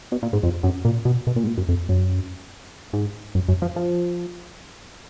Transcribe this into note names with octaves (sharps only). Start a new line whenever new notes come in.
B2
A#2
G#2
F2
F#2
A#2
B2
B2
A#2
G#2
A#2
F#2
F2
F#2
G#2
F#2
F#2
F3
F3